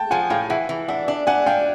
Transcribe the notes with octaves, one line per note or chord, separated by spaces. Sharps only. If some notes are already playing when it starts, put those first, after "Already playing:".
Already playing: G5 A5
F3 F#5 G#5
A2 F5 G5
E3 E5 F#5
E3
D4 E5 F#5
D4
D4 F#5 G#5
D4 F5 G5